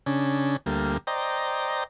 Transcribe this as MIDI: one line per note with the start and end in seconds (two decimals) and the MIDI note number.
0.06 0.57 49
0.06 0.57 61
0.06 0.57 62
0.66 0.98 38
0.66 0.98 55
0.66 0.98 58
1.07 1.84 72
1.07 1.84 74
1.07 1.84 75
1.07 1.84 79
1.07 1.84 82